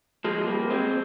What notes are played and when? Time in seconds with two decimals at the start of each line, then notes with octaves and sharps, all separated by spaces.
0.24 F3 G#3
0.47 G3 A#3
0.70 G#3 C4